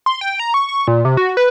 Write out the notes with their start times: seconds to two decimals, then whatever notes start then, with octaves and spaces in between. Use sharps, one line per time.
0.06 C6
0.21 G5
0.39 A#5
0.54 C#6
0.69 C#6
0.87 A#2
1.05 C3
1.17 F#4
1.37 B4